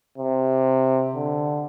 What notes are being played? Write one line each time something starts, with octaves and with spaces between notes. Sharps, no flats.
C3
D3